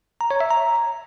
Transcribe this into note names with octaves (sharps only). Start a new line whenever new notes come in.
A#5
C#5
E5
A#5